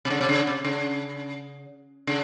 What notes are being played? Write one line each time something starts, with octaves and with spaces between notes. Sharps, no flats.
C3
C#3
C3
C#3
C3
C#3
C#3